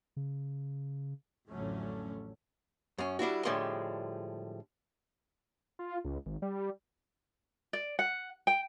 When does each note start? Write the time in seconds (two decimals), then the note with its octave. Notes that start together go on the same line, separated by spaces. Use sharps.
0.16 C#3
1.49 A1 F2 D3 F#3 A3 C#4
2.98 F#2 C#4
3.19 G3 D4 E4 F#4
3.45 A2 D3 F3 G3 G#3 C6
5.79 F4
6.05 C#2
6.26 G#1
6.42 G3
7.73 D5
7.99 F#5
8.47 G5